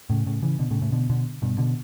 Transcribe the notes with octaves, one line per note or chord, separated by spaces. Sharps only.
A2 C#3
A2 C#3
C#3 E3
B2 D3
A2 C#3
A2 C#3
B2 D3
B2 D3
G2 B2
B2 D3